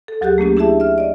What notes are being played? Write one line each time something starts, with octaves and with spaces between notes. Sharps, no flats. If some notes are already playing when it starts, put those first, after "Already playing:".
A4
D2 F#3 G4 G#4 F#6 G6
A3 A#3 C#4 G4
D4 E4 G4 G#4 E5 A5
E5 F6
D5 D#5